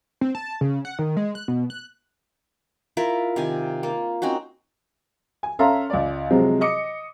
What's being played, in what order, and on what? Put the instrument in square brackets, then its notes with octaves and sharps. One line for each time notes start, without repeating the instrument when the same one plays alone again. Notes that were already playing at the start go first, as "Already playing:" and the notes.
[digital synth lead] C4
A5
C#3
F#5
D#3
G#3
F#6
B2
F#6
[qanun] E4 F4 A#4 E5
C3 D#3 F5 G#5
A#3 F4
C4 C#4 D#4 F#4
[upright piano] G#5
C#4 A4 E5 F5 A#5 C6
C#2 D5
C3 F3 F#3 G#3 C4
D#5 D6 C#7